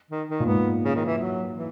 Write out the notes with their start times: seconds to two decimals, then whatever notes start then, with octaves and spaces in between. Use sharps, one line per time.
0.10 D#3
0.29 D#3
0.40 A#2
0.46 G#2 B3
0.85 C#3
0.95 D#3
1.06 E3
1.18 F#3
1.53 E3